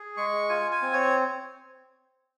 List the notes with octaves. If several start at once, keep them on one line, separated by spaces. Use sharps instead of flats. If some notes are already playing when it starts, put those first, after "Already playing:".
Already playing: G#4
G#3 C#6
F4 G#5
G#5
C4
C#5